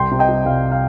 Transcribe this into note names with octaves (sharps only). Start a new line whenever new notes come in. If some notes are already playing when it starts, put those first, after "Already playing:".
Already playing: C2 G5 C6
C3
D#5 G5
G3
C2 F5
F5